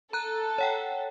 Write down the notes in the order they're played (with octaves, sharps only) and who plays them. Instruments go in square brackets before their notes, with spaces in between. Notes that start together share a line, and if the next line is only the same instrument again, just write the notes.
[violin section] A4 [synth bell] A#5 F#6
[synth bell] C#5 F#5 G5